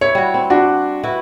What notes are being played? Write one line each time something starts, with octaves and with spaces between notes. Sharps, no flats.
E4 C#5
G3 F#4
C4
D4 F#4
E4 F#4 B4